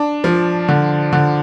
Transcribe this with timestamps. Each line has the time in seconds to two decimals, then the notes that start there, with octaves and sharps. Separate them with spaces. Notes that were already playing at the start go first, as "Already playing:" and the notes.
Already playing: D4
0.24 F3
0.69 D3
1.13 D3